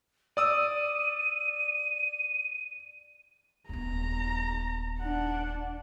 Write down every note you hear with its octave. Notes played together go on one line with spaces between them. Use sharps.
D5 D#6 E6 D#7
D#1 B3 A#5
D4 F#5